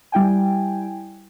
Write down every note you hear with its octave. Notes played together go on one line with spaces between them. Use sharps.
G3 E4 G5 G#5